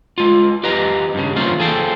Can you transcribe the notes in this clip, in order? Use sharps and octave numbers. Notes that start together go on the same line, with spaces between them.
G#3 F4
G4 B4 D#5 F5 A#5
G2 C#3
E3 A#3 C#4 F4 C5 C#5
G#4 A4 C5 F5 G5